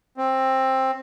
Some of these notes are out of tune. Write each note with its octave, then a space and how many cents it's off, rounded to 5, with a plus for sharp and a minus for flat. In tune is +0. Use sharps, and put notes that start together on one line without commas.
C4 +15